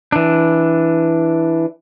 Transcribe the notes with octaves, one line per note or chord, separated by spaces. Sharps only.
E3 D4